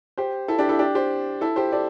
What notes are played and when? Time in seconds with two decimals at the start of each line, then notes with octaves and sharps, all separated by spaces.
0.18 G4 C5
0.48 E4 A4
0.59 D4 G4
0.69 E4 A4
0.79 D4 G4
0.95 G4 C5
1.41 E4 A4
1.56 G4 C5
1.72 A4 D5